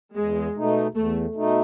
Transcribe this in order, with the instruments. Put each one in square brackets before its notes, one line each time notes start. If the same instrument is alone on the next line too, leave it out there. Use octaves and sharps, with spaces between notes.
[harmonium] E2 [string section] G#3
[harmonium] B2 A3 D#4
[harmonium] E2 [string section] A3
[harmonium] B2 A3 D#4